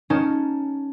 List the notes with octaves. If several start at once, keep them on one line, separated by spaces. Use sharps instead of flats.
C#4 D#4 A#4 A5